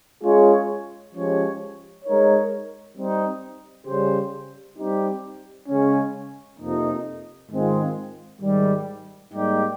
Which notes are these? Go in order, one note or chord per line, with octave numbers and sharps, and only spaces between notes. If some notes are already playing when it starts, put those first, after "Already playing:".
G#3 C#4 F4 G#4 C#5
F3 G#3 C#4 G4 C#5
G#3 D#4 A#4 C#5
G3 C4 D#4
C#3 G3 C#4 G4 C5
G3 C4 D#4 G4
C#3 G#3 C#4
F2 C3 F3 A#3 D#4
G#2 D#3 G#3 C4 F4
G#2 D#3 G3
G#2 G3 A#3 D#4 G4